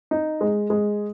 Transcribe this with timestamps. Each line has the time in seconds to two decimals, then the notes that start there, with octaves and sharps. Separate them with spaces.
0.11 D#4
0.41 G#3
0.70 G#3